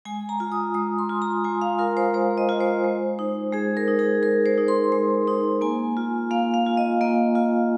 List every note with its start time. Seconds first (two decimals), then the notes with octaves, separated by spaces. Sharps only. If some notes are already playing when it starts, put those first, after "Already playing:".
0.05 G#3 G#5
0.29 A#5
0.40 F4
0.52 D#6
0.74 G#3 D#6
0.99 C6
1.09 F4
1.22 A#5
1.44 G#3 G#5
1.62 F5
1.79 F4 A#4
1.97 C5
2.14 G#3 C5
2.38 D#5
2.49 F4
2.61 C5
2.84 G#3
3.19 D#4
3.52 G#3 G#4
3.77 A#4
3.88 D#4
3.99 G#4
4.22 G#3 A#4
4.46 C5
4.58 D#4
4.68 C6
4.92 G#3 C6
5.27 D#4
5.61 A#3 G#5
5.97 F4
6.31 A#3 F5
6.54 F5
6.66 F4
6.77 D#5
7.01 A#3 D#5
7.35 F4